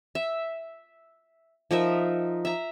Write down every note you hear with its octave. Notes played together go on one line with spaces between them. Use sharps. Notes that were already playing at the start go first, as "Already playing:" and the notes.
E5
F3 D#4 A#4 E5
E5 A#5